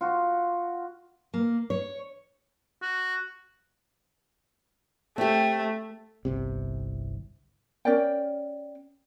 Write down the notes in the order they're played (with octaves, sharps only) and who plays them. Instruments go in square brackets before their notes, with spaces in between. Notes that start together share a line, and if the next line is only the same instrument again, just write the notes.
[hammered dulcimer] F4 F#4
[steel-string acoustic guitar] A#3
C#5
[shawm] F#4
[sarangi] A3 [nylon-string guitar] C4 G4
[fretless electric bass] G1 C2 C3
[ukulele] C#4 A#4 D5 G5